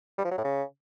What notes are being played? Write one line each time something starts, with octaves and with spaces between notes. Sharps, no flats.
G3
F3
F#3
A2
C#3